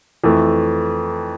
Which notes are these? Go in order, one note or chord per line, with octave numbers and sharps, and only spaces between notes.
F2 E3 A3